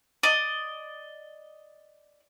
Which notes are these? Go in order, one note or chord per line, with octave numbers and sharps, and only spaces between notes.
D5 D#5